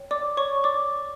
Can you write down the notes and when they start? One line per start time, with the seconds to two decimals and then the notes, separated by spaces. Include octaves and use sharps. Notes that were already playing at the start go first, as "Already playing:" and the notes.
Already playing: C#5 G5
0.11 D5 D6
0.37 C#5 C#6
0.64 D5 D6